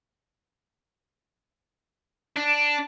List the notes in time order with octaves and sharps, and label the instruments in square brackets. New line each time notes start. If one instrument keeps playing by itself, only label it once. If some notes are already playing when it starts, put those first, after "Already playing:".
[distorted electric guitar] D4